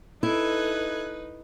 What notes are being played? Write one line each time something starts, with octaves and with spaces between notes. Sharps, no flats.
D#4 E4 A4 B4 F#6 G#6